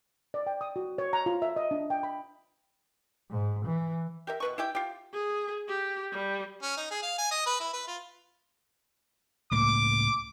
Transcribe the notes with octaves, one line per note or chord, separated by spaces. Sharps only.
D5
G5
D#6
F#4
C#5
A#5
F4
E5
D#5
D4
G5
B5
G#2
E3
G4 A#4 E5
B2 B4 C#6
E4 G4 G5
F4 G4
G#4
G4
G3
C#4
D#4
G#4
F5
G#5
D#5
B4
E4
B4
F4
C#2 A2 A#3 D6